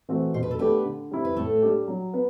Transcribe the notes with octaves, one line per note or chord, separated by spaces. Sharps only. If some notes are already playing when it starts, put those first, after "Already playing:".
E3 A3 C4 F#4
B2 C5
B4
A4
A3 B3 D4 G4 B4
D3
G3 C4 E4
B4
A2 A3 A4
G3 D4 G4
F#3
B3